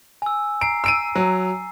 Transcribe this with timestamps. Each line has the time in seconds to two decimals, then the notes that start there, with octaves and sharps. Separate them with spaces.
0.22 G#5 E6
0.61 A#5 C7 D7
0.84 E6 D7 D#7
1.15 F#3